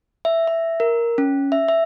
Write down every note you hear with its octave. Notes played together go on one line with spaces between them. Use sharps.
E5
E5
A#4
C#4
E5
E5